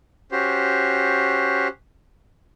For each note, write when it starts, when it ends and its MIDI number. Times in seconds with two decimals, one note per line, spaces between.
0.32 1.68 61
0.32 1.68 66
0.32 1.68 67
0.32 1.68 72